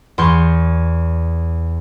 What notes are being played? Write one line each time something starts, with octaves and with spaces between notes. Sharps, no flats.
E2 C6 C#6 G6